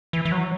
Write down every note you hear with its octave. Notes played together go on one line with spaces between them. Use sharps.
E3
E3
F#3